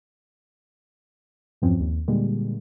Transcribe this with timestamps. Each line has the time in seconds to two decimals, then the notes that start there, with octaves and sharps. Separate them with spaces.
1.62 E2 G2 E3 F3 C4 C#4
1.80 D#2
2.08 A#2 D3 G3 G#3 A#3